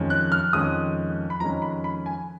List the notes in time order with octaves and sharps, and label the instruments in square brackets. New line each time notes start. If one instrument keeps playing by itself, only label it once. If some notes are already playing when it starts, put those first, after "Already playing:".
Already playing: [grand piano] F2 D#3 G#3 C#4
F#6
F6
F2 D#3 G#3 C#4 D#6
B5
F2 D#3 G#3 C#4 A#5
B5
B5
G#5